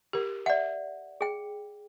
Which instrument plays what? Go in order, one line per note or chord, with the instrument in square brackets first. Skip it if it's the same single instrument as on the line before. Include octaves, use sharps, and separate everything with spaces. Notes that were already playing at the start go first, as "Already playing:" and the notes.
[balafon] G4 A#4
[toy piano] D5 F#5 [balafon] E5
[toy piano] G#4 G5